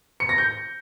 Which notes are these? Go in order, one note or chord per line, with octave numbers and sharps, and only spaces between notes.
C#7
A#6
G6